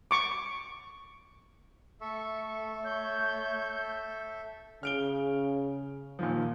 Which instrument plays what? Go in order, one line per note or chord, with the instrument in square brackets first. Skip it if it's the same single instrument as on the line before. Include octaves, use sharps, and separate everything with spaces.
[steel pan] C#6 D6
[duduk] A3 [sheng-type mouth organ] A4 E5 [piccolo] C#6
[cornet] C#5 [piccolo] G6
[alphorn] C#3 [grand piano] F6 D7 G7
[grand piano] A#2 D#3 F3